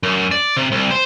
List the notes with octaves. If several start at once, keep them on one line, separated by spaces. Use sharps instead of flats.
F#2
D5
C3
C2
C5